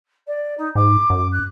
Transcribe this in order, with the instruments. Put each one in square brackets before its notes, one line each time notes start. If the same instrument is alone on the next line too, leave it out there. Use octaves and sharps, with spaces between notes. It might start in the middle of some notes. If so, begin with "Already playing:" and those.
[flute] D5
D#4
[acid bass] G#2 [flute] D6
[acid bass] F#2
[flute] F#6